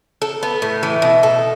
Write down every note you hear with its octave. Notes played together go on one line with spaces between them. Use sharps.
A4
B3
A2
E3
B2
A4